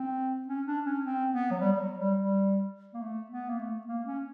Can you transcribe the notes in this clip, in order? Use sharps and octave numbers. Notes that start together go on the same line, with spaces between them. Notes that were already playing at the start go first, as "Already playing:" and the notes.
Already playing: C4
C#4
D4
C#4
C4
B3
F#3
G3
G3
F#3
G3
G3
A#3
A3
B3
A#3
A3
A#3
C#4